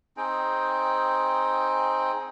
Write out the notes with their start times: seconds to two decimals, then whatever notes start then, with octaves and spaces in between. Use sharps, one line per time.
0.17 C4 D#4 G#4 G5